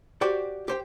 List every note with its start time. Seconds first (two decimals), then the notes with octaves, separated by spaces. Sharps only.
0.21 F#4 G4 C5 D5 G5
0.68 G4 C5 G5